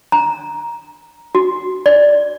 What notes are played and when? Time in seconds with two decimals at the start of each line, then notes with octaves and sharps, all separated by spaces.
0.12 A#5
1.35 F#4
1.86 D5